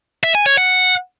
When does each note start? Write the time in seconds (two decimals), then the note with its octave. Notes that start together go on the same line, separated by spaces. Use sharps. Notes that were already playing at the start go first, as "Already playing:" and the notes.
0.24 E5
0.35 G#5
0.46 C#5
0.57 F#5